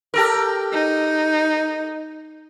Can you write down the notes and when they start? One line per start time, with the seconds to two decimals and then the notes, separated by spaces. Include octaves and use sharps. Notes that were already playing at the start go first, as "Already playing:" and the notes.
0.14 G4 A4 A#4
0.72 D#4